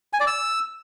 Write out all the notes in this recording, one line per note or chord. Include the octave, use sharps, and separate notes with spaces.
G#5
D5
E6